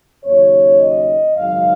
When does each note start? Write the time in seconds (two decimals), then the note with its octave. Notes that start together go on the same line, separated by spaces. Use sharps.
0.24 D#2 C#3 F#3 C#4 C#5
0.79 D#5
1.35 G#1 F#2 C#3 G#3 D#4 F5